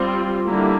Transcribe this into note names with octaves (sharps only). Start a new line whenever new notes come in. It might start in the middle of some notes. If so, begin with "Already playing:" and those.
Already playing: G3 C4 F4
D3 G3 A#3 E4